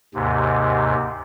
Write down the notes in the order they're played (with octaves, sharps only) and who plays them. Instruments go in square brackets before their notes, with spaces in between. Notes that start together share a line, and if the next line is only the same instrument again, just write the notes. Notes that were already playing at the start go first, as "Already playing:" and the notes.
[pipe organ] D#2 G#2 C3